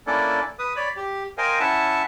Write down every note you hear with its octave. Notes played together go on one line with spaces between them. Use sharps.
A#3 C#4 D4 E4 A4 D5
B4 D#6
C#5 D5 B5
G4
A#4 C5 D#5 F5 G5 G#5
C#4 E4 E5 F#5 A5